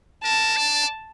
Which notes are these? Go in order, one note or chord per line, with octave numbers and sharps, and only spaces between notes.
A#4 A5
D5